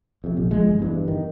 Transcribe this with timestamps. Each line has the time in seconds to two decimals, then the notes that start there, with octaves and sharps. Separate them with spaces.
0.24 F2 C3
0.37 A#1
0.51 G1 F3 G#3
0.80 E2 G2 E3
1.08 D#3